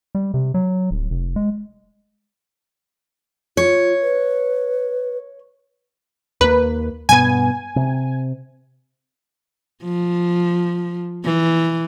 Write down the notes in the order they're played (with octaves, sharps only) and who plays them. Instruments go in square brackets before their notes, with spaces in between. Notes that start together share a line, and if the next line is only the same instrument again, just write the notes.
[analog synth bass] G3
C3
F#3
D1
F1
G#3
[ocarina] F4 [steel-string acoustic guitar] C#5
[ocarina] B4
[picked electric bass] D#2 A#3 [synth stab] B4
[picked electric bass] G2 B2 B3 [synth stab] G#5
[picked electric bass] C3
[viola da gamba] F3
E3